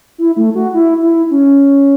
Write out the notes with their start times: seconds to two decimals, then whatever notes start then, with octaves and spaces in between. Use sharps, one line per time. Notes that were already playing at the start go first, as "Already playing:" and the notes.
0.18 E4
0.37 A3
0.55 F#4
0.74 E4
1.02 E4
1.30 C#4